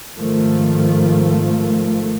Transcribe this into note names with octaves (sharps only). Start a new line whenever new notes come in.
G#1 D#3 F3 A3